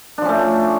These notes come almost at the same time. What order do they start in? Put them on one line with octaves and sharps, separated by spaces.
D4 F3 C#4 A3